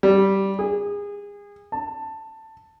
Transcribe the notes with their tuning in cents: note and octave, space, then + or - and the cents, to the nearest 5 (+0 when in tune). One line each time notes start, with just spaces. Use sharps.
G3 -10
G#4 -30
A5 +10